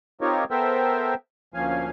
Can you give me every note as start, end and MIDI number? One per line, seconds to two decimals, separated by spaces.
0.21 0.44 60
0.21 0.44 63
0.21 0.44 65
0.21 0.44 67
0.21 0.44 70
0.21 0.44 73
0.51 1.14 59
0.51 1.14 69
0.51 1.14 70
0.51 1.14 72
0.51 1.14 76
0.51 1.14 79
1.54 1.90 38
1.54 1.90 46
1.54 1.90 53
1.54 1.90 61
1.54 1.90 77
1.54 1.90 80